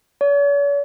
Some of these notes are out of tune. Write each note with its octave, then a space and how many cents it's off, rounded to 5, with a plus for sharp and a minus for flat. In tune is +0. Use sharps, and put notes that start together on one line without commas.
C#5 +45